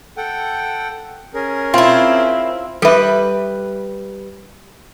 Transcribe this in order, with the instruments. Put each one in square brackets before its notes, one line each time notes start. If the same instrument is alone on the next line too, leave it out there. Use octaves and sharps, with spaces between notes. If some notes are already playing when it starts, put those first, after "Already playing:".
[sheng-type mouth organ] A4 F#5 G5
C#4 G#4 A#4
[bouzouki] C4 E4 [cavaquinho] F4
[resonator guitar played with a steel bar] G3 B4 [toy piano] A4 E5